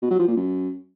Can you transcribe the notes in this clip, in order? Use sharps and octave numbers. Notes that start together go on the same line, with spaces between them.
B2
F#3
F3
A#2
F#2